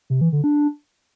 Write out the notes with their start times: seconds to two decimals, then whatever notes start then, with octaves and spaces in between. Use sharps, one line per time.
0.10 C3
0.21 E3
0.32 D3
0.44 D4